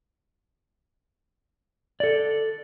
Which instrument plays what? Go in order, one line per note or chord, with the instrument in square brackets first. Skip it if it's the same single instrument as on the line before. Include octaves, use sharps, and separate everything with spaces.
[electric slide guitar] A4 D5